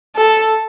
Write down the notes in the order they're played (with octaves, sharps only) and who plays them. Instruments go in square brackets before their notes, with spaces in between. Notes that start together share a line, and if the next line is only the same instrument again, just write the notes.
[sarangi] A4